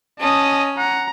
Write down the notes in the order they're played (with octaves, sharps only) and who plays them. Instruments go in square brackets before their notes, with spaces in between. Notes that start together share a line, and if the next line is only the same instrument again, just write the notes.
[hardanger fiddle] C#4 [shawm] D#5 [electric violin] A5 D#6
[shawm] F#5 [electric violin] A#5